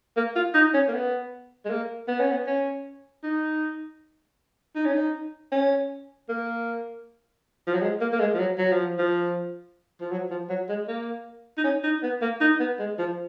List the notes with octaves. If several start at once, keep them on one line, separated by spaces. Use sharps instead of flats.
A#3
F4
D#4
C#4
A#3
B3
G#3
A#3
B3
C#4
B3
C#4
D#4
D#4
C#4
D#4
C#4
A#3
F3
F#3
G#3
A#3
A#3
G#3
F3
F#3
F#3
F3
F3
F3
F#3
F3
F#3
G#3
A#3
D#4
C#4
D#4
B3
A#3
D#4
B3
G#3
F3